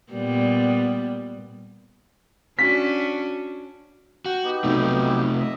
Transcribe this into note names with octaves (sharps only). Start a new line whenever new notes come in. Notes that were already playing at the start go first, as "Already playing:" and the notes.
A#2 G3 B3
C#4 D4 F#4 B6
F#4 G5
B3 D#4 G4
B1 C3 A3
D#5 E5